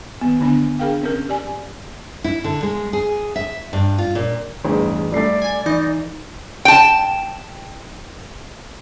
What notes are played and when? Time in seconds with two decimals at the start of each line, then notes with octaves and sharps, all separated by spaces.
0.21 D#3 B3
0.41 D3 B3 D4 G#5
0.79 D4 G#4 A#4 F5 G5
1.03 C4 C#4 A#4
1.29 G4 D5 G#5
2.24 E4
2.44 D3
2.63 G#3
2.93 G#4
3.36 E5
3.73 G2
3.98 F4
4.15 A#2
4.65 A1 E2 G2 G#4
5.12 G3 A3 A4 D5 C7
5.42 G#5
5.66 E3 D#4
6.65 G5 A5